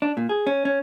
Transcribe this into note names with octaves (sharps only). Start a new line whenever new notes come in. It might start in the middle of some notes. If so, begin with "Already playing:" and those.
D4
A#2
G#4
C#4
C#4